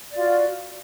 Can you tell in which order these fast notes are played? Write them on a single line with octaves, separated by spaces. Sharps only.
D5 F4 F#4